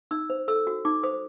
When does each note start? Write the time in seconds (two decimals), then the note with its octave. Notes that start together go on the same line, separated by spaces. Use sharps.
0.11 D#4 E6
0.30 C5
0.48 A4 E6
0.67 F#4
0.85 D#4 D6
1.03 C5 D#6